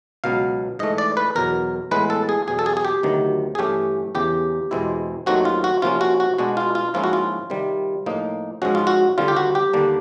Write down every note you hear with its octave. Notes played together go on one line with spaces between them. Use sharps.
C#2 B2 F#3 B3 F5
G#2 E3 A3 D#5
D5
B4
E2 B2 F#3 A#4
A2 E3 G#3 B3 B4
A4
G#4
E2 B2 F#3 G#4
A4
G#4
G#4
G4
D2 C3 D#3 F#3
G#4
G2 E3 A3 C#4 G4
E2 C#3 E3 G4
E2 B2 G#3 C4 E4
D#2 D#3 F#3 A3 C4 F#4
F4
F#4
C3 F3 A#3 C#4 F4
F#4
F#4
B2 G#3 B3 D4 F#4
F4
F4
G#2 F3 A#3 C#4 E4 F4
F#4
F4
C3 D#3 G3
A2 F3 A#3 D#4
G#2 F3 G#3 C#4 F#4
F4
F#4
D#2 D3 G3 C4 F4
G4
F#4
G4
D#2 D3 G3 A#3 D4